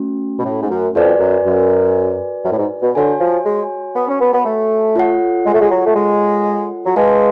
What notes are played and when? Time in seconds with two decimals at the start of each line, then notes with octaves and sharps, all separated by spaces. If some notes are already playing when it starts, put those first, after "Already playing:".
Already playing: A3 C#4 F#4
0.39 B2
0.45 A2
0.62 G#2
0.70 F#2
0.95 F2 F#4 B4 D5 G#5
1.19 F#2
1.45 F#2
2.45 F#2
2.52 A2
2.58 G#2
2.82 B2
2.95 D3 F#4 C#5 G#5
3.20 F3
3.45 G#3
3.96 B3
4.08 C#4
4.20 B3
4.33 B3
4.45 A3
4.96 F4 A4 C#5 F#5
5.46 G#3
5.54 A3
5.61 G#3
5.71 F#3
5.86 A3
5.95 G#3
6.86 F#3
6.96 G#3 G#4 B4 F5 A5